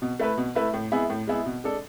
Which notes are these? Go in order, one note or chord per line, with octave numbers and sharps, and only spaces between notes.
B2
A3 E4 B4
B2
A3 E4 B4
A2
G#3 B3 E4 G#4
A2
G#3 B3 E4 G#4
B2
G#3 D4 A4